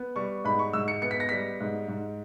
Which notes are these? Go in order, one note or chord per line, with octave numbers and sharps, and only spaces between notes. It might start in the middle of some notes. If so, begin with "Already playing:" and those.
Already playing: B3
G3 C#6
G#2 B5
C#6
G#2 E6
C#7
B3 C#7
B6
A#6
G3 B6
G#2
G#2